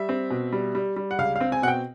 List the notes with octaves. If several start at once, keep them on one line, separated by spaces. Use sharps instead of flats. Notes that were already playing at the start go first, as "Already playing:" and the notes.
Already playing: G3 E5
C4
B2
G3
G3
G3
F#5
C#2 F5
C4 F5
G#5
B2 F#5
G5